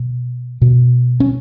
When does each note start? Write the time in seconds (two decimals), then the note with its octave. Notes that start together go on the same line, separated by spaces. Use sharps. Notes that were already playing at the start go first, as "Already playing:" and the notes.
Already playing: B2
0.62 B2
1.20 C#4